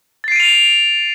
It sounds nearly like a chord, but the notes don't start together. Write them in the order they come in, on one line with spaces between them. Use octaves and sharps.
A6 C7 D7 D#7 F7